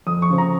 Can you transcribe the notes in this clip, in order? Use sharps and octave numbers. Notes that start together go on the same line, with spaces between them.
F2 D#6
C#6
C#3 F3
A#5